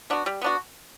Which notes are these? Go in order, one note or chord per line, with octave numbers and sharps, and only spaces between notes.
B3 D4 F#4
G3
B3 D4 F#4